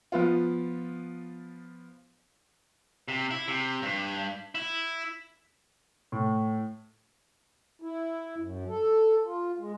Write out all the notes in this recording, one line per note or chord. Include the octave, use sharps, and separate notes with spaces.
F3 B3 F4
C3
E4
C3
G2
E4
A2
E4
F#2
A4
F4
G#3